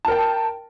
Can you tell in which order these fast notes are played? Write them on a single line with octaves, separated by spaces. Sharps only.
A5 A#4 G5